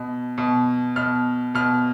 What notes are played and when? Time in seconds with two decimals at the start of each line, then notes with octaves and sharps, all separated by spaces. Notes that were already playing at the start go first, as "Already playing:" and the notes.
Already playing: B2
0.38 B2
0.96 B2 F6
1.55 B2 F6